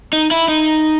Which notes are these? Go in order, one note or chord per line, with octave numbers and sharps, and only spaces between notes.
D#4
E4
D#4